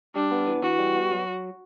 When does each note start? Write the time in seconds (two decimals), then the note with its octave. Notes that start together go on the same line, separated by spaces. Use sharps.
0.15 G3 D4
0.31 B3
0.47 E3
0.63 E3 F#4
0.79 G3
0.95 B3
1.11 F#3